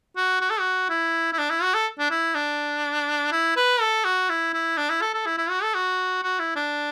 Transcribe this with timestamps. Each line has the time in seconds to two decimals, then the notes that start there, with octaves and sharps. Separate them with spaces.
0.16 F#4
0.41 F#4
0.50 A4
0.60 F#4
0.89 E4
1.33 E4
1.38 D4
1.50 E4
1.62 F#4
1.74 A4
1.99 D4
2.11 E4
2.35 D4
3.32 E4
3.56 B4
3.81 A4
4.04 F#4
4.29 E4
4.53 E4
4.77 D4
4.90 E4
5.01 A4
5.14 A4
5.26 E4
5.38 E4
5.50 F#4
5.63 A4
5.74 F#4
6.23 F#4
6.39 E4
6.55 D4